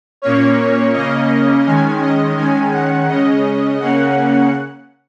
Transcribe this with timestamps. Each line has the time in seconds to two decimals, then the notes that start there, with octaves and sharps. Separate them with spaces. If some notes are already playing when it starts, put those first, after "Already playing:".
0.22 A#2 A#3 C#4 C#5
0.93 C#3 A#3 C#4 D#5
1.65 D#3 G#3 C#4 G#5
2.01 D#5
2.36 D#3 G#3 C#4 G#5
2.72 F#5
3.08 C#3 G#3 C#4 D#5
3.80 C#3 A#3 C#4 F#5